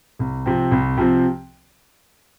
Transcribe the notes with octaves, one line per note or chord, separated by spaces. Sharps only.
C2
C3 F3 C4
C2
C3 F3 C4